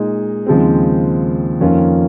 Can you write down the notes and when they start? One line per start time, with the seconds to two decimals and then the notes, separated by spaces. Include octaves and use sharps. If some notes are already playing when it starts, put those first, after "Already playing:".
Already playing: A#2 G#3 D#4
0.46 D#2 C#3 F3 G#3 C4
1.60 F2 D#3 A#3 C#4 F4